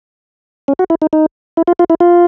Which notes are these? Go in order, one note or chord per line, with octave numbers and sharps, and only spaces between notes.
C#4
F#4
E4
D#4
D#4
E4
F4
F4
E4
F4